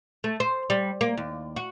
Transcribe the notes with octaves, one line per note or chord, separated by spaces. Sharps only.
A3
C5
G3
A#3
D#2
F#4